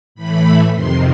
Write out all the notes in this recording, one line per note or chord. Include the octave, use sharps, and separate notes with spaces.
A2 E3 A3 B5
F2 C3 D#3 C6